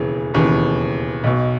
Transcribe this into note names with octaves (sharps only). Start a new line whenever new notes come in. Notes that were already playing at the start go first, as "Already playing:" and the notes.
Already playing: E1 D#2 C#3 E3
E1 D#2 C#3 E3
B1 B2